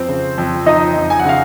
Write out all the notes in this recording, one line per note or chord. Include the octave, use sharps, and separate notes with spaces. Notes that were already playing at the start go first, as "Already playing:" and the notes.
Already playing: F2 C4 C5
C#3
F2
F3 D#4 D#5
F2
G#5
F#5
C#3 F5